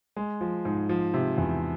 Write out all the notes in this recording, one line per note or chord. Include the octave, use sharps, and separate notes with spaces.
G#3
F3
G#2
F3
C3
E2